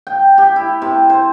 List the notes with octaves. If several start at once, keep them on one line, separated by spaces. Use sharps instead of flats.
G5
G4
E4
C3
C5